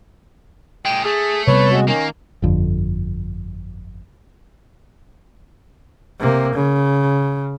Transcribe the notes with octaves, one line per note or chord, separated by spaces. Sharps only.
A#2 G#3 G5
A3 G#4
C3 G3 B3 B4 C#5
G#3 F#4
D#3 A#3 C#4
G1 F2 D3
C3 A#3
C#3